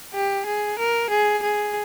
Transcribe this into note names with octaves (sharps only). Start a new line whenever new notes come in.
G4
G#4
A#4
G#4
G#4